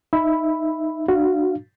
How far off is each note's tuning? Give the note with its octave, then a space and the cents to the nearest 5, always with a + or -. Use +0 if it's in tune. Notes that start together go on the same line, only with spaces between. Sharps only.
D#4 +0 E5 +0 B5 +0
D4 +30 F#4 +0 F5 -15